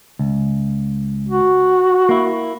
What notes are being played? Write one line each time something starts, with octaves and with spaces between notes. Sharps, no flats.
C#2
F#4
A#3 E4